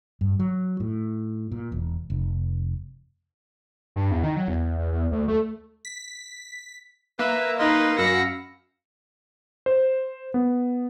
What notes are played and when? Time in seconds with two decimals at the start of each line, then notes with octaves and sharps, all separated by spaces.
0.21 G2
0.40 F#3
0.80 A2
1.52 A#2
1.72 E1
2.10 F1
3.96 G2
4.11 E2
4.23 D#3
4.36 F#3
4.48 E2
4.63 E2
4.78 E2
4.92 E2
5.11 D2
5.28 A3
5.85 B6
7.19 A#3 B4 E5
7.59 D#4 A#4 B4 D#5 F5 C6
7.98 F#2 F5 B5 E6 A#6 C#7
9.66 C5
10.34 B3